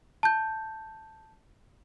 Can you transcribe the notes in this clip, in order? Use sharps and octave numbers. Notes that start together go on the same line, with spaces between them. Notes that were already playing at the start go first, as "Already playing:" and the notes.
A5 G6